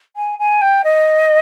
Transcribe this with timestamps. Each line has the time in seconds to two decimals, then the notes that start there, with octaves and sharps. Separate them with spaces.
0.16 G#5
0.39 G#5
0.61 G5
0.84 D#5